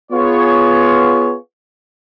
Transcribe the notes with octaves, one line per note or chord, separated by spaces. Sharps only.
B3 F4 G#4 C#5